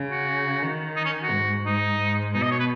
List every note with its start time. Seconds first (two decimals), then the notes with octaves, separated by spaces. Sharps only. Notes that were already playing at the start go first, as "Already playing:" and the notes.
Already playing: C#3
0.11 F#4
0.62 D#3
0.96 D#4
1.05 C#4
1.23 F#4
1.31 G#2
1.65 G#2 D#4
1.99 G#2
2.34 B2 D#4
2.43 D#5
2.51 C#5
2.60 B4